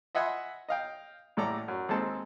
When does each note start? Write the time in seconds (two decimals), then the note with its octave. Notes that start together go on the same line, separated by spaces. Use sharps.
0.15 D#5 E5 F#5 G#5 B5 C6
0.69 D#5 F5 G5
1.37 A1 A2 A4 D5 A#5
1.68 F#2
1.89 D#2 G#3 C4 A4 A5